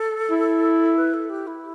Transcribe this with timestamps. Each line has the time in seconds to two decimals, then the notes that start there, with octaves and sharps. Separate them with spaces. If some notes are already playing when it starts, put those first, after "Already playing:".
Already playing: A4
0.31 E4
0.97 B4
1.14 A4
1.30 G4
1.47 E4